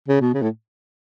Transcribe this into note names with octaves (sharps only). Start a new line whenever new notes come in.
C#3
B2
C#3
A2